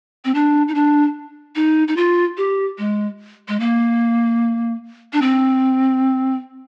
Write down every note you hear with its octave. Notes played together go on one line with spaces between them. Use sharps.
C4
D4
D#4
D4
D#4
D#4
F4
G4
G#3
G#3
A#3
D4
C4